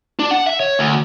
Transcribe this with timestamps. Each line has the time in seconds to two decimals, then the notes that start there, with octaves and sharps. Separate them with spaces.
0.19 D4
0.31 F#5
0.46 E5
0.60 C#5
0.79 D2